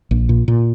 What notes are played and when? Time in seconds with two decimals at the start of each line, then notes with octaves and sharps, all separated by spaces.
0.11 A#1
0.29 A#2
0.48 A#2